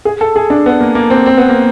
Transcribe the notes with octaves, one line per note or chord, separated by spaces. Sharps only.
G#4
A4
G#4
D4
B3
A#3
A#3
C4
C4
B3
A#3